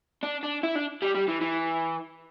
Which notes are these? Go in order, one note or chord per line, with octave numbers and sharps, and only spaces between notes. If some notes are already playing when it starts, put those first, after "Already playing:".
D4
D4
E4
D4
G3
G3
E3
E3